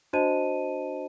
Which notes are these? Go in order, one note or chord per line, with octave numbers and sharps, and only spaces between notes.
D4 F#4 C5 D#5 A5 D#7